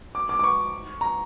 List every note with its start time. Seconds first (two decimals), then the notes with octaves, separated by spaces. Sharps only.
0.15 D6
0.29 D6
0.39 D6
0.44 C#6
1.01 A#5